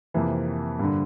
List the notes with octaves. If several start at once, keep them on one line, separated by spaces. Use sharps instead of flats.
F2 C3 E3 A#3
G2 D3